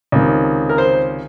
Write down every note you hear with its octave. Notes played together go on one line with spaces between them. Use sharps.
C#2 C3 D#3
A#4
C5